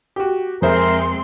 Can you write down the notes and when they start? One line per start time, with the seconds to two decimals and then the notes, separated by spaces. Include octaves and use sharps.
0.16 F#4 G4
0.62 F2 G#3 C4 G#4 A#4 C5 E5 C6